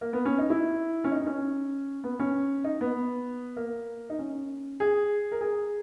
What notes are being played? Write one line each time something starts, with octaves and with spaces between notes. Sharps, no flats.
A#3
B3
C#4
D#4
E4
C#4
D#4
D#4
C#4
B3
C#4
D#4
B3
A#3
D#4
C#4
G#4
A#4
G#4